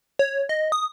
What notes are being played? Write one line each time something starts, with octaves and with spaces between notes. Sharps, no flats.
C#5
D#5
D#6